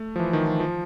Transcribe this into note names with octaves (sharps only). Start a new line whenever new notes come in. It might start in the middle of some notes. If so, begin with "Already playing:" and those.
Already playing: A3
F3
E3
D#3
F3
F3